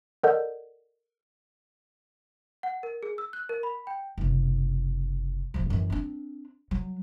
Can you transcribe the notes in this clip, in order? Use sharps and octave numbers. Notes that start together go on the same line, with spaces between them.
A4 A#4 D5 D#5 F#5 G6
F#5
A#4
G#4
E6
F#6
A#4
B5
G5
F#1 C3
D#1 F3
F#2 E3
C4 D4
F#3